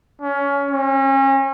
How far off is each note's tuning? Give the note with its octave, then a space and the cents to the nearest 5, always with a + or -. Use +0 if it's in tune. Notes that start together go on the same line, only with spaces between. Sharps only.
C#4 +20
C#4 -35